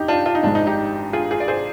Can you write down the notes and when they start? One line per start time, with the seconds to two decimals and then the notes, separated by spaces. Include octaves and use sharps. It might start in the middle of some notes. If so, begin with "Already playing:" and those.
Already playing: F1 D#2 D#4 G4
0.08 D4 F4
0.26 D4 F4
0.35 D#4
0.43 G#1 G#2 F3 G#3 D4
0.55 D#4
0.67 D#4 G4
1.13 F4 G#4
1.31 F4 G#4
1.40 D5
1.48 G#4 C5